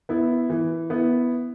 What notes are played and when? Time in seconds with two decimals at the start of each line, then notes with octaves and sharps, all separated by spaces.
0.09 B3 E4
0.50 E3
0.90 B3 E4